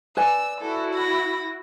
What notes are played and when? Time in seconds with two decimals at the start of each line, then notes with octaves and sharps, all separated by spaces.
0.17 B4 D5 G#5 E6
0.61 E4 F#4 A4
0.94 B5 A#6